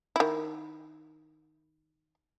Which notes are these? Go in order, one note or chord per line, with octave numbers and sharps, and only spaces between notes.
D#3 E4